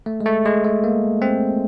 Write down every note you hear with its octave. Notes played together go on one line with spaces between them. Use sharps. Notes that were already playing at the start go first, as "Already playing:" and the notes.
A3
G#3
A3
G#3
A3
A#3
C4